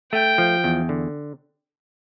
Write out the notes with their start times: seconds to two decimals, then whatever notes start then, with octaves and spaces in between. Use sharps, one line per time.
0.12 A3 G5
0.38 F3
0.64 E2
0.89 D3